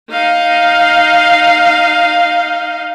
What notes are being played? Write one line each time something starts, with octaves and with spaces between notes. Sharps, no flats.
D#4 F5